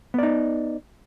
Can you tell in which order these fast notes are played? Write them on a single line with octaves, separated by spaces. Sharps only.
B3 D5 D#4